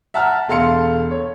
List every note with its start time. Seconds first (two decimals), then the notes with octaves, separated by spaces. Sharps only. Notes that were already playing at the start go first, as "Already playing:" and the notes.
0.14 E5 F#5 A5 A#5 F6
0.48 E1 A4 F5 C6 C#7
1.11 C#5